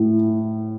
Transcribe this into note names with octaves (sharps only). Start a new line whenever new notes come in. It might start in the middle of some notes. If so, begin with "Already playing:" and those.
Already playing: A2